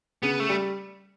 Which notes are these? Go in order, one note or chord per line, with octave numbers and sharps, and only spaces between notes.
C#3 B3
A3
G3